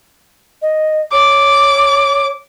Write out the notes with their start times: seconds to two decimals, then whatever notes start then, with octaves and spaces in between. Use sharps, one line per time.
0.62 D#5
1.13 C#5 D6